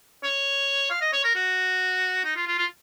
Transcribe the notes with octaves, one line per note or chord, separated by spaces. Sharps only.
C#5
F5
D#5
C#5
A#4
F#4
D#4
F4
F4
F4